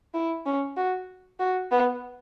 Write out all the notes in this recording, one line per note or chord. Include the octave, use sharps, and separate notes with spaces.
E4
C#4
F#4
F#4
B3